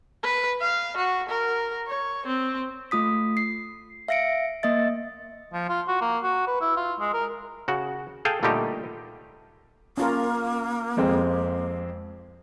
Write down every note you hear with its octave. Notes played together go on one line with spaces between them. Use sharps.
B4
F5
F#4
A#4
C#5
C4
A3 F4 D#6 B6
C7
E5 F5 A#6 C#7 D7
A#3 D#5 E5 A6
F3
F4
F#4
A#3
F#4
B4
E4
F4
G#3
A#4
C#3 F#4
G#4 A4 F5 G5 G#5
A#2 D3 G3 A3 D#4 G4
A#3 C#4 F4 A#4
F2 G#3 C4